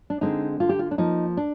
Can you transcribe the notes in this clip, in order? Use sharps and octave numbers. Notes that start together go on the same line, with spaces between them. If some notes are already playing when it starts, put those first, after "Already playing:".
D4
D3 G#3 C4 D#4
D3 F4
G4
F4
D4
F3 A#3 D#4
D4